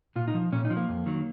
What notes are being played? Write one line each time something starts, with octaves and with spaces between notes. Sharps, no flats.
A#2 F4
D#4
F3
A#2 C#4
D#4
F3
A#3
F2
D#3 F#3